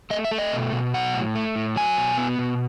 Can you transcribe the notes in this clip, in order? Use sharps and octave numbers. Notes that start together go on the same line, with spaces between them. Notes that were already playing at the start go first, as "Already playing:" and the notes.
A3 D#5
E5
A3
D#5
B2
B2
F#3 F#5
A2
A3
A2
F#3 G#5
B2
B3
B2